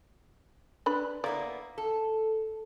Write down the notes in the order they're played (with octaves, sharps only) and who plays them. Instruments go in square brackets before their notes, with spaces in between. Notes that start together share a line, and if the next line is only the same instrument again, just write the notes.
[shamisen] D4 B4 B5
[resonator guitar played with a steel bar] A#3 B3 E4 [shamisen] D5
[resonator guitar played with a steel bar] A4